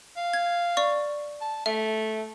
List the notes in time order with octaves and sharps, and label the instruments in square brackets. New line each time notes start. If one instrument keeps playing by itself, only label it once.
[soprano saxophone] F5
[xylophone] G#6
D5 C#6
[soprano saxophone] A5
[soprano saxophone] A3 [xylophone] E5